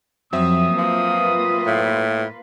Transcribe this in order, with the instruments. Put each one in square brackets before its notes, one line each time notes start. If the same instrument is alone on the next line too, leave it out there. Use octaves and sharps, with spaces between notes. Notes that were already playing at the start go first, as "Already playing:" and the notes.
[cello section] F2 [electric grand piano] F#3 C4 E5 [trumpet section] D#6
[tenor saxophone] F3 [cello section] A#3 F4 B4
[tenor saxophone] A2